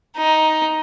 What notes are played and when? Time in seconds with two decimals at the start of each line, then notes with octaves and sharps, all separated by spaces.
0.17 D#4